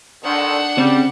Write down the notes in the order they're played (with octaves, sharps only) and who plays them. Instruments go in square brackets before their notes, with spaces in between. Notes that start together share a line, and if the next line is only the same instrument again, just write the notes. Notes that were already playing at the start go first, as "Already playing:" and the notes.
[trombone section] D3 D#3 [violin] D4 F#5
[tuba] C#3 [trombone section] G3 [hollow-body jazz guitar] C4